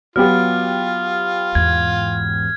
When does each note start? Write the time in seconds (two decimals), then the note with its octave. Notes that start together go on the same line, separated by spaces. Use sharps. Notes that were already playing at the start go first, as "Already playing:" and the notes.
0.16 F#3 B3 F4 G4 F6
1.55 E2 G#2 G#6